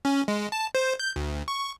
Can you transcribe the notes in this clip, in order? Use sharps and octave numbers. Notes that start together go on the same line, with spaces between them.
C#4
G#3
A5
C5
G6
D2
C#6